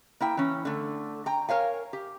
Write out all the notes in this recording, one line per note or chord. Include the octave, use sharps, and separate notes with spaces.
A#3 E4 G5
E3 C#4
D3 A3
G5 A#5
A#4 C#5 F5 G#5
G4